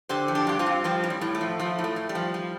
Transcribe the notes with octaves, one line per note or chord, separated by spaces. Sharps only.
D3 G4 C5
F3
D4 G4
G2 G4
C4 F4
G2
F3 G3 C4
A2
G3
A2
A3
F3
F3 A3
A2
A3
A2
G3
F3
F3